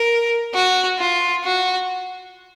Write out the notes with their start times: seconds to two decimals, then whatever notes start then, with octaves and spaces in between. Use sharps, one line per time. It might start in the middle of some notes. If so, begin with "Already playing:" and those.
Already playing: A#4
0.54 F#4
0.99 F4
1.44 F#4